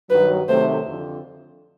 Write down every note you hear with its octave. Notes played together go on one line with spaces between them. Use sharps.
G2 D#3 F#3 B4
C3 D#3 F#3 A3 C5
F2 D3